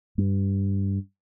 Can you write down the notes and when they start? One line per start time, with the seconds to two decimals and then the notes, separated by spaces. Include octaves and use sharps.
0.18 G2